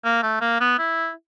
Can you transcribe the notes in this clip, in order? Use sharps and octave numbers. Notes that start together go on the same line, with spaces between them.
A#3
A3
A#3
B3
E4